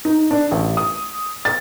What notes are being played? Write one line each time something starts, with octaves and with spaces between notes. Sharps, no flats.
D#4
D4
A1
D#6
A6